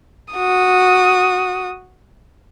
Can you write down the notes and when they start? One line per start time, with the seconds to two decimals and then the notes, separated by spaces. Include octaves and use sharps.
0.33 F#4 D#6